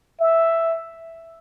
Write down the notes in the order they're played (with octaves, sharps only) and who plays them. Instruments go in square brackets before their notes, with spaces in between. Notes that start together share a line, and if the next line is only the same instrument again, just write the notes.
[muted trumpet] E5